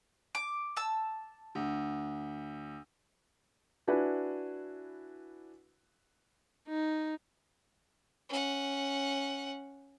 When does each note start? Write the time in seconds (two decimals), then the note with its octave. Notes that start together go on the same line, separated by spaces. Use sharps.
0.35 D6
0.77 A5 E6
1.55 D2
3.87 D4 E4 F#4 B4 G#5
6.68 D#4
8.29 C#4 F#5